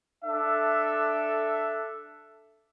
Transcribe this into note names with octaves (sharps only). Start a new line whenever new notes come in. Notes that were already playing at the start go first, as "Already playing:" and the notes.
D4 A4 E5